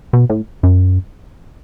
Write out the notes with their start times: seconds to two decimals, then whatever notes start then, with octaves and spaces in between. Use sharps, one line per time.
0.13 B2
0.30 A2
0.63 F#2